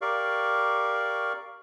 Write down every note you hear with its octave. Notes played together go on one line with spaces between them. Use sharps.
G4 A#4 D5 F5 C#6